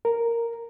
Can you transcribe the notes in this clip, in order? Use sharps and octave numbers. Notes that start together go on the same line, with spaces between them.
A#4